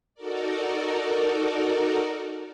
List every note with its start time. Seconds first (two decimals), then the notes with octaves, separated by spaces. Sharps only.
0.14 D#4 F#4 A4 A#4 D5